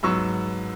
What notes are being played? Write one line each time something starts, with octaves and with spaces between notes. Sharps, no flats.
G#2 F#3 B3 C#6 E6